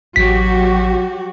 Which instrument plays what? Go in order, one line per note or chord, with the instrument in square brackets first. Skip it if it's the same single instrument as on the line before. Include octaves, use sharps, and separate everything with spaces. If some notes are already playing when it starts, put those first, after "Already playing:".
[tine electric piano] A1 B6 [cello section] F#3 F#4 G4